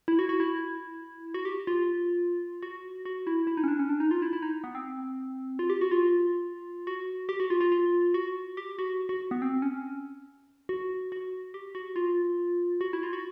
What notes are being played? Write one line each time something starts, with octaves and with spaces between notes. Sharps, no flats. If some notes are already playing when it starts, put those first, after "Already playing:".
E4
F#4
F#4
E4
F#4
G4
F4
F#4
F#4
E4
E4
D#4
C#4
D4
C#4
D4
D#4
F4
E4
E4
D#4
B3
C4
F4
G4
F#4
F4
F#4
G4
F#4
F4
F4
F4
F#4
G4
F#4
F#4
B3
C4
C#4
F#4
F#4
G4
F#4
F4
F#4
E4
F4
F#4